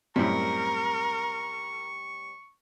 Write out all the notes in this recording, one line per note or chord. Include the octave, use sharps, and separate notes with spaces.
F#2 A2 G3 C4 A#4 C#6